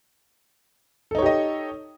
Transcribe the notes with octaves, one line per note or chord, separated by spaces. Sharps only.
D#4 G4 A4 C#5 D#5